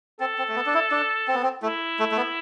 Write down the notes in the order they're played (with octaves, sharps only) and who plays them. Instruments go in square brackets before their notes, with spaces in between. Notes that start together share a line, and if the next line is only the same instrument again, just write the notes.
[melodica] C4 [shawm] A4
[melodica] C4
A3
B3
D4
E4
D4
C4
B3
C4
[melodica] A3 [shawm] E4
[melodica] A3
A3
B3